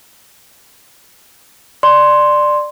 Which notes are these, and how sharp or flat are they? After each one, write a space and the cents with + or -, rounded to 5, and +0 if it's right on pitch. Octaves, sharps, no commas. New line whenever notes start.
D5 +15 C6 +0